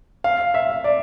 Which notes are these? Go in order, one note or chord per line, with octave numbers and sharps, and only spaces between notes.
F5
E5
D5